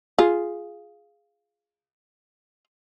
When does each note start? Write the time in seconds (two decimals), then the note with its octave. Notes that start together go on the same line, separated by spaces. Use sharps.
0.19 F4 G#4